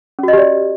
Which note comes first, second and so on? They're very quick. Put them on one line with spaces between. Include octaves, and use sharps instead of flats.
C#4 F#4 D#5 G4 D5